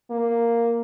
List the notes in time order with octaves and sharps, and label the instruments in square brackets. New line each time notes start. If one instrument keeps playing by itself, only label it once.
[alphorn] A#3